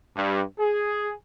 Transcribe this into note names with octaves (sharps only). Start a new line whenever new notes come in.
G2
G#4